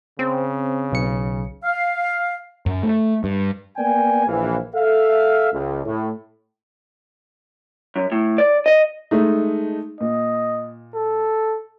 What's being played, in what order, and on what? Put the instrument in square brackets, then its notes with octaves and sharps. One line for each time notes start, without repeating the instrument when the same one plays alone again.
[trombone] C#3 [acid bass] C4
[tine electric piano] B1 C#7
[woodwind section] F5
[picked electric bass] F#2
A3
G2
[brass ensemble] A#3 B3 D5 G5 G#5
A#1 E3 F5
A4 E5 F5
C#2
A2
[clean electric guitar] F#2
A2
D5
D#5
[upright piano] G#3 A3 D#4
[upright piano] A#2 [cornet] D#5
[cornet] A4